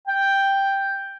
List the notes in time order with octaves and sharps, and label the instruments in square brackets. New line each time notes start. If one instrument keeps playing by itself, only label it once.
[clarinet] G5